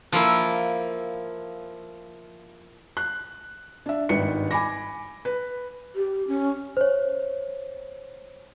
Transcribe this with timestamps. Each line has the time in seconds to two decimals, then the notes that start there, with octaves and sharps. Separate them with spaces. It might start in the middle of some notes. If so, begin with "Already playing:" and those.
0.12 F3 A#3 E4
2.97 F#6
3.86 D4 E5
4.09 G#1 G2 D#3 B4 C#7
4.51 G#5 B5 D6 A#6
5.25 B4
5.96 G4
6.28 C#4
6.77 C5 C#5